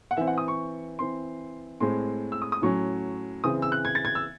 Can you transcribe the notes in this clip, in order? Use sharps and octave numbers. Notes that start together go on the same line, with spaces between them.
F#5
E3 C4 E5
F#5
D#6
C#6
E3 C4 C6
A2 G#3 C4 C6
E6
D#6
D#6
A2 F#3 C#4 C#6
C#3 E3 C4 D#6
E6
F#6
G#6
A6
G#6
E6